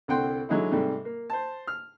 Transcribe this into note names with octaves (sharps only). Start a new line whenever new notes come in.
C2 D3 C4 F#5 G5 C6
D3 F#3 G#3 D#4 E4
G#2 C3 G3 A3
A#3
C5 A5
F6